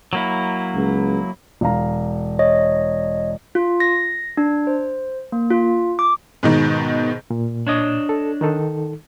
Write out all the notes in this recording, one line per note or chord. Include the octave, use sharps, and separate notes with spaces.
F#3 A#3 E4
C#2
E1 F5 A#5
C#5 D#5
F4
A#6
D4
C5
A#3
F4
D6
G#2 B2 D#3
A#2
D4 C#5 D#5
A4
D#3 D#4 A4